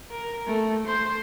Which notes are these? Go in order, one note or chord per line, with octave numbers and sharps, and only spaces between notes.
A#4
A3
C5